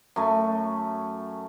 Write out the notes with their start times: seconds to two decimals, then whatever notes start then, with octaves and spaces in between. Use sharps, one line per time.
0.16 F#2 A3